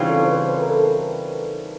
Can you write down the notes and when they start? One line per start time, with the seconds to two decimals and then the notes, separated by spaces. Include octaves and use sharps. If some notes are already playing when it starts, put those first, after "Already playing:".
Already playing: C#3 E3 G3 C4 D#4 F4
0.09 A4
0.25 C5
0.32 B4
0.54 B4
0.62 A#4
0.70 A4
0.76 A#4